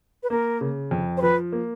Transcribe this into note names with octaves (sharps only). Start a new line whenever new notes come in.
B4
A#3 A#4
C#3
F2
C5
F3 B4
A#3